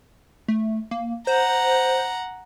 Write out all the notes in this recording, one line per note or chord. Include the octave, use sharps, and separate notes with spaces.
A3
A#3
C5 F#5 A#5